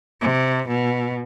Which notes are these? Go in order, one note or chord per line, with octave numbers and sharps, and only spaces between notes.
C3
B2